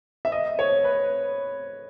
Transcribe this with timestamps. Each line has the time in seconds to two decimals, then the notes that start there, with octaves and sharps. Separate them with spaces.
0.25 E5
0.32 D#5
0.59 C#5
0.84 B4